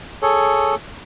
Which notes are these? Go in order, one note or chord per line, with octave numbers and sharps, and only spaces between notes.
G#4 A4 C#5